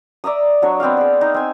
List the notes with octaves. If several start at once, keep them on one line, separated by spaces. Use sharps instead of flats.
D5 E5 A#5 D#6
F#3 D4 C#5 D#5
B3 C4 D5 F5
G#4 D5
D#4
C4 G#5 E6